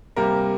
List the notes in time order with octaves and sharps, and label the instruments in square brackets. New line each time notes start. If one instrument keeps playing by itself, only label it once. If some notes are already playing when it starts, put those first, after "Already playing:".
[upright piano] C3 G3 A#3 A#4